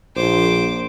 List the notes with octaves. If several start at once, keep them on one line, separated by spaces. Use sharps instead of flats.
A#1 C5 D6